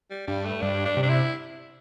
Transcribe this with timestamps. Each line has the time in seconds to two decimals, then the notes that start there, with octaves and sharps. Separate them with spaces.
0.11 G3
0.27 G2 G3
0.45 A3
0.62 G2 D4
0.85 D4
0.97 C3
1.03 D4
1.09 E4